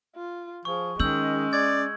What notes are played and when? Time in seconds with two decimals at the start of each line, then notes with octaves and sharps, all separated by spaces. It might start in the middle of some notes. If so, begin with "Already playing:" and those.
0.16 F4
0.65 F3 G#4 C#6
1.00 D#3 G#3 C#4 E6 G6 F#7
1.53 D5 G#6